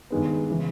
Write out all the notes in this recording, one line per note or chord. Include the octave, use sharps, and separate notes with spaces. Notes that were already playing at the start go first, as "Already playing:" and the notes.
G2 D#3 G#3 B3
C#3 E3